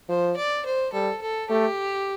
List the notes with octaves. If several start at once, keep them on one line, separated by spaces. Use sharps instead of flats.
F3 C5
D5
C5
G3 A4
A4
A3 G4